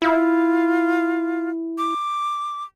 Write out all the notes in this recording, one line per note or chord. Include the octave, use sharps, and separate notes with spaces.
E4 F4
D6